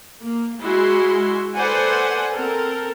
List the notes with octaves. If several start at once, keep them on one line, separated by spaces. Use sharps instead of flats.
A#3
G#3 E4 F#4 C6
A4 B4 C5 D5 F#5 G#5
C4 A4 A#4